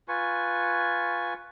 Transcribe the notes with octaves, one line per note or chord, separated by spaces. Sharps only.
F4 B4 G#5 C#6